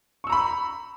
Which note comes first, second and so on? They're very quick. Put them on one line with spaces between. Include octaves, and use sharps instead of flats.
C#6 E6 A#5 B5